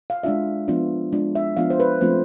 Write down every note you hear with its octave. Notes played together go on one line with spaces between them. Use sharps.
F5
G#3 D4 F4 E5
F3 B3 D4 F4
G#3 D4 F4
E5
F3 B3 D4 F4 F5
C5
B4
F3 A3 C4 F4 C5